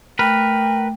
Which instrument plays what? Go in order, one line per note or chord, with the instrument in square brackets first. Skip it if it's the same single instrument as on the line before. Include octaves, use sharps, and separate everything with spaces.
[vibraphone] A3 [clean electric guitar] A#4 B4 [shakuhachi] G5